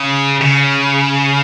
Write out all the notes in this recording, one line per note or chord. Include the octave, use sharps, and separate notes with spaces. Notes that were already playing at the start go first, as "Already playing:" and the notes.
Already playing: C#3
C#3